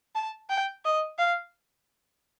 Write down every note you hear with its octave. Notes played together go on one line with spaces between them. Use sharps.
A5
G5
D#5
F5